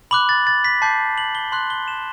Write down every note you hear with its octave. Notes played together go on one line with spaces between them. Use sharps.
B5 D6 F#6 F#7
A6
A6
B6
A5 D6 G6 C7
F#7
G7
C6 F#6 F#7
G7
E7